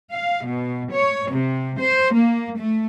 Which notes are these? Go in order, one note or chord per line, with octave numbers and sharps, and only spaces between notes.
F5
B2
C#5
C3
C5
A#3
A3